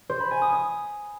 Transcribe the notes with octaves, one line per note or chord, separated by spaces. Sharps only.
C5
B5
G#5
D#6
D#6